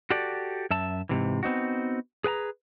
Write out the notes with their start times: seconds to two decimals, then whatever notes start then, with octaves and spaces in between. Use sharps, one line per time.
0.10 F#4 G4 A4 D5
0.70 F#2 E5 A5
1.09 G#2 C3 E3
1.43 B3 C4 D#4 F#4
2.24 G#4 B4 G#5 A#5